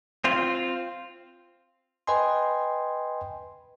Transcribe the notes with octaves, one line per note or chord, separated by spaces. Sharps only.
C4 F4
B4 D#5 G5 G#5 C6